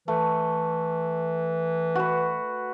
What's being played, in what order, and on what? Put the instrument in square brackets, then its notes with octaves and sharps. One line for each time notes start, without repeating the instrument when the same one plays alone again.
[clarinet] E3 [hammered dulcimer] A3
[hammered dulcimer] F#4 B4